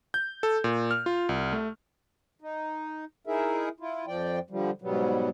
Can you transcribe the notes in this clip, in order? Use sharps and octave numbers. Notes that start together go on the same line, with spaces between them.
G6
A4
A#2
F6
F4
C2
A3
D#4
D#4 E4 G#4 A#4 E5
E4 F4
F2 F3 D5 G5
D3 F3 G3
G#2 B2 F#3 G3 B3